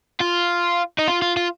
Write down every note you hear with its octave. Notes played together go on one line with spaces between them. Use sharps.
F4
D#4
F4
F4
F4